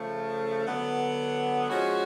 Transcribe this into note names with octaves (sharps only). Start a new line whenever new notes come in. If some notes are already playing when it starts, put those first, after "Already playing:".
Already playing: C#3 F3 A3
D3 F#3 B3
F3 G#3 C#4 F#4